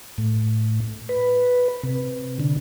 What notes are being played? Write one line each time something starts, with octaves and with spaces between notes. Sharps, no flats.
A2
B4
C3
D3